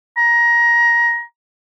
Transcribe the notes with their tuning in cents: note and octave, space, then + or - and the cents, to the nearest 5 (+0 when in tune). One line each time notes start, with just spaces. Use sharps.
A#5 +20